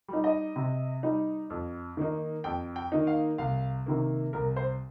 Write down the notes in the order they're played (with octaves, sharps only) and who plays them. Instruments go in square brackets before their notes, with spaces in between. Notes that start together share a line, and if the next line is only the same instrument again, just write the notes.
[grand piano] G3 D#4
D#5
C3
G3 D#4
F2
D#3 A#3 D#4
F2 G5
G5
D#3 A#3 D#4
F5
C2 F5
C3 D#3 A#3
C2 A#4
C5